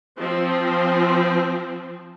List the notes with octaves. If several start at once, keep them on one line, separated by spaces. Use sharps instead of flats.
F3 C4